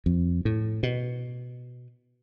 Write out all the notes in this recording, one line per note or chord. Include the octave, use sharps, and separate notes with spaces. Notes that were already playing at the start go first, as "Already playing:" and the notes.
F2
A2
B2